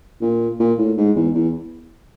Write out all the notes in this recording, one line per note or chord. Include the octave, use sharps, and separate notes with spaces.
A#2
A#2
A2
G#2
E2
E2